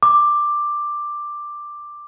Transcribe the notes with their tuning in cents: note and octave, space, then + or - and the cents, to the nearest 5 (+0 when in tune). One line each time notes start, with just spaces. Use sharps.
D6 +10